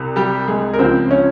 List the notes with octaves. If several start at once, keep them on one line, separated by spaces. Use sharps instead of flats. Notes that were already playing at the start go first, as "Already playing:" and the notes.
Already playing: C2 C3
G3 G4
G#3 G#4
A#4
C#2 C#3 F3 C4 C5
C#4 C#5